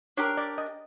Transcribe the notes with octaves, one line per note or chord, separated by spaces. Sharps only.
D4 G4 A#4 C#5
D5
D#5